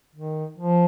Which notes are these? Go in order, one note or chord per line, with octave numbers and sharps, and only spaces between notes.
D#3
F3